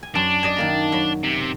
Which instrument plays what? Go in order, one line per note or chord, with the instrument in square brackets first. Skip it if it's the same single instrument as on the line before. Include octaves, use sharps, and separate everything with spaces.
[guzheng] G#5
[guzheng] F#2 [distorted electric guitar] D4
[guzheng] D5 D#5 G#5
D#3 A#3 A#5
F#3 B5
[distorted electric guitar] C3